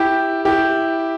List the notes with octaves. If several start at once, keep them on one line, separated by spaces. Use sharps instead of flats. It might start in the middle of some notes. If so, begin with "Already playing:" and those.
Already playing: E4 G4
E4 G4